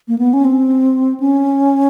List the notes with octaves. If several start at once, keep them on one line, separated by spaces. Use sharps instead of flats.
A#3
B3
C#4
C4
C#4